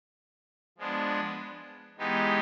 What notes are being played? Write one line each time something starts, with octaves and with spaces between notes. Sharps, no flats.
F3 G#3 B3 D4
E3 G#3 B3 D#4 G4